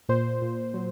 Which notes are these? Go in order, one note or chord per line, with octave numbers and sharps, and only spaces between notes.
A#2 C5
A#2
F#3